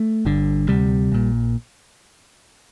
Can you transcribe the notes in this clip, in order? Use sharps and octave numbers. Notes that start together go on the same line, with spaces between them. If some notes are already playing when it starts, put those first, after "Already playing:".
Already playing: A3
G1 G2 D3
D2 C3 G3
A#1 A#2